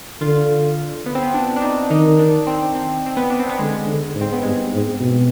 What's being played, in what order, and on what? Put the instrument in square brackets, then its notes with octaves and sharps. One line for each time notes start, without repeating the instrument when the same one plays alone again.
[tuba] D3 [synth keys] F4
[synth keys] B3
C4
B3
D4
D4
D#4
[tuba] D#3 [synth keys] D#4
[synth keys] D4
C4
C4
C4
B3
D4
C4
B3
[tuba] D3 [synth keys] G#3
[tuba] D3
G#2
[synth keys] C4
B3
[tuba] G2 [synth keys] G#3
[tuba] G#2
B2